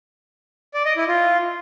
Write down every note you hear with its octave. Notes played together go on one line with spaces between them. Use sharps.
D5
D#5
E4
F4